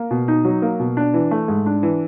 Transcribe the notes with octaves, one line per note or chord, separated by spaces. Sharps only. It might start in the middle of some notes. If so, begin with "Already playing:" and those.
Already playing: A#3
B2
D#4
F#3
A#3
B2
D4
E3
A3
G#2
D4
E3